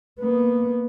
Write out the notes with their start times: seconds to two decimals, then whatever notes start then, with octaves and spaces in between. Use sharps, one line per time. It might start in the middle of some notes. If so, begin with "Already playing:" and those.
0.20 A#3 B3